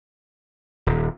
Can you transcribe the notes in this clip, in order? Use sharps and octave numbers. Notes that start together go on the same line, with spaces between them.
D#1